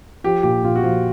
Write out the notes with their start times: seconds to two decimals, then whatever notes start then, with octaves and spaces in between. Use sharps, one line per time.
0.24 F3 G4
0.43 A#2 G4
0.63 A#2 F4
0.76 F#4
0.84 F3 F4